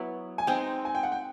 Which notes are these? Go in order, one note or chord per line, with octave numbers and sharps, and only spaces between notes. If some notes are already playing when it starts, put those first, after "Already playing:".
Already playing: F#3 B3 E4
G#5
G#3 C4 D#4 G5
G#5
G5
F#5
G5